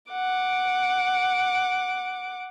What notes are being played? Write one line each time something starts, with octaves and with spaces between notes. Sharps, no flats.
F#5 D6